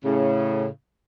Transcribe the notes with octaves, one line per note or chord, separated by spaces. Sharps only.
A2 C#3